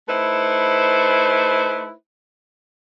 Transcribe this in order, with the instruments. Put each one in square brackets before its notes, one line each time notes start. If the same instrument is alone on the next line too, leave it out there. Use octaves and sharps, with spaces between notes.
[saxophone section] A3 D#4 E4 B4 C5